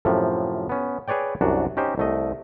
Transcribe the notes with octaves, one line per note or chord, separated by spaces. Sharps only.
F#2 A2 C3 F3
B3 C#4
G#4 B4 C#5 D5 G5
C2 F#2 D4 F#4
C#4 D#4 G4 C5
C2 A3 D#5